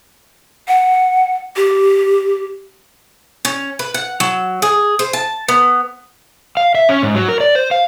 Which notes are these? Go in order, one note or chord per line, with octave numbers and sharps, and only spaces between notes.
F#5
G4
C#4
B4
F#5
F#3
G#4
C5
A5
B3
F5
E5
C#4
G#2
F#3
A#4
D5
C5
F5